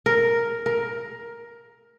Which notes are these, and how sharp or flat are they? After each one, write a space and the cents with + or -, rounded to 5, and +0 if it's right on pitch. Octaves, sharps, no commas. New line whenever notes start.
A#4 +0
A#4 +10